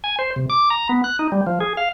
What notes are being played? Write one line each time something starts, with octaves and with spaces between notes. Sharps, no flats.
G#5
C5
C3
D6
A#5
B3
F#6
D#4
G3
F3
G#4
F5